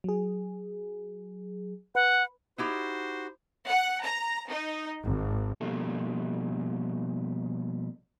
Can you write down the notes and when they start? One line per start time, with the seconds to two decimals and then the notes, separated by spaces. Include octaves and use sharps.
0.04 F#3 G#4
1.95 B4 F#5
2.58 D#4 E4 F#4 G4 C5
3.67 F#5
4.04 A#5
4.50 D#4
5.03 G#1
5.61 B2 F3 G3 A#3 D4 A4